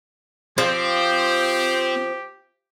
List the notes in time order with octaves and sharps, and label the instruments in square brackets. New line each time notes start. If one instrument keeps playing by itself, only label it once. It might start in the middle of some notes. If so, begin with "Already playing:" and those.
[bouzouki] F3 [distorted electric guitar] C4 [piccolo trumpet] G4 [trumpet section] C5